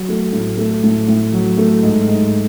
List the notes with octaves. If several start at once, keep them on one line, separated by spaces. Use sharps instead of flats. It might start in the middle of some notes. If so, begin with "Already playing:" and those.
Already playing: F#3
A3
A2
A3
A2
A2
F#3
A3
G#2
G#2